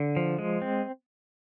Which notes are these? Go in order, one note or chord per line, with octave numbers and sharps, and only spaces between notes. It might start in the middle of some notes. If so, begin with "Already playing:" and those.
Already playing: D3
F3
G#3
C4